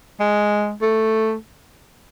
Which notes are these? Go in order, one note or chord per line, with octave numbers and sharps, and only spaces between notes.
G#3
A3